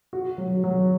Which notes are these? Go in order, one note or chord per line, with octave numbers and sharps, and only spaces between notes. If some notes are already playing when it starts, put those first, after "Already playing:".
F#4
F#3
F#3